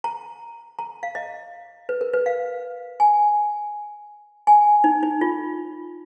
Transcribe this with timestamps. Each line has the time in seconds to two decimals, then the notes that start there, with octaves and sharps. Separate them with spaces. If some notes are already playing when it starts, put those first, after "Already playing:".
0.04 A#5
0.79 A#5
1.03 F5
1.15 D#5
1.89 B4
2.01 A#4
2.13 B4
2.26 F5
3.00 G#5
4.47 G#5
4.84 D#4
5.03 D#4
5.21 F4